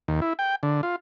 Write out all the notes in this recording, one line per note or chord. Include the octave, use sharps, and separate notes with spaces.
D#2
E4
G5
D3
F4